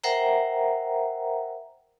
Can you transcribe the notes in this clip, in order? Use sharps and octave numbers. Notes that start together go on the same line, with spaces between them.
A#4 C5 E5 F#5 G5 A#5